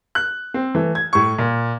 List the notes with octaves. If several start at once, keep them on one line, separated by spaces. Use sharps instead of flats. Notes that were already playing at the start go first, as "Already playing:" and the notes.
F#6
C4
E3 A3
G#6
A2 C#6
A#2